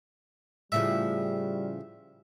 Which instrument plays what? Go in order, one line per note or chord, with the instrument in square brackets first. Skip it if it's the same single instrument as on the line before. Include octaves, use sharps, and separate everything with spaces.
[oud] A2 C#3 F3 [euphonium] G3 [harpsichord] E5